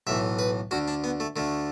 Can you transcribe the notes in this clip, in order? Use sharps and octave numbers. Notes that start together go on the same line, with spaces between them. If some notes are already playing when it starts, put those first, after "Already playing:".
B1 A2 E3 E5
B4
D2 D3 F#4
D4
B3
A3
D2 D3 A3